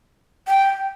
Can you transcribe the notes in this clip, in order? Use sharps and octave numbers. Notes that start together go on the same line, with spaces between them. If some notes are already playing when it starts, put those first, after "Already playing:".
G5